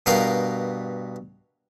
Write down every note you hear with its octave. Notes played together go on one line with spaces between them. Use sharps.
G2 B2 A#4 D#5 F5 G5